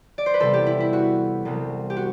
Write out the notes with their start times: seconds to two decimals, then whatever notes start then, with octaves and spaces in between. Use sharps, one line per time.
0.18 D5
0.26 C5
0.34 B4
0.40 E2 C3 G3 B3 A4
0.53 G4
0.66 E4
0.80 E4
0.93 F#4
1.45 C2 C3 G3 B3
1.90 G4
1.97 F#4